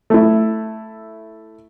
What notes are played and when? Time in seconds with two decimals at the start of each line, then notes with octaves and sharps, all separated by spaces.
0.10 A3 E4